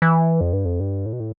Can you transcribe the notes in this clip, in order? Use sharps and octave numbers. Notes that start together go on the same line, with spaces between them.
E3
F2
G2
F2
G2
A2
B2
A2